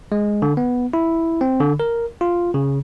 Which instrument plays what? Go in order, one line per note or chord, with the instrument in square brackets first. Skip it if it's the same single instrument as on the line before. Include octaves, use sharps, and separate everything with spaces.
[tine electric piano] G#3
D3
B3
E4
C4
D3
A#4
F4
C#3